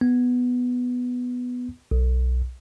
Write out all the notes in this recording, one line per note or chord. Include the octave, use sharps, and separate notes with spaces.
B3
B1